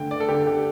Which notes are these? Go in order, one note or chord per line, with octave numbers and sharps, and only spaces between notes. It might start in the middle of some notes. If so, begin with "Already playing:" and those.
Already playing: D3 A3 G5
D5
A4
D3 G4
G4